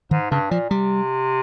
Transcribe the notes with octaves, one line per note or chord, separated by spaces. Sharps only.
G#2 D#3
G2 C#3
A#2 F3
C3 G3